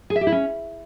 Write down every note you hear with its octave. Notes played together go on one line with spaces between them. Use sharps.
G#4
E5
G4
E4
C#4